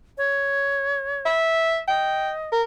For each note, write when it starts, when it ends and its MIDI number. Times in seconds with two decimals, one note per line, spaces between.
0.18 1.29 73
1.25 1.80 76
1.88 2.50 75
1.88 2.30 79
2.52 2.62 70